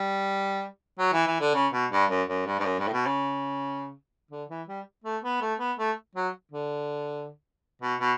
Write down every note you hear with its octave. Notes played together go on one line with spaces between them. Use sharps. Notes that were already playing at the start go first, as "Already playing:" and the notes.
Already playing: G3
F#3
E3
E3
D3
C#3
B2
G2
F#2
F#2
G2
G2
F#2
G2
A2
B2
C#3
D3
E3
G3
A3
B3
A3
B3
A3
F#3
D3
B2
B2